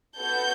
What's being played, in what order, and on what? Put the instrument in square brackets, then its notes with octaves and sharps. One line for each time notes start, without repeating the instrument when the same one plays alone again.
[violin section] B3 F#4 A4 G6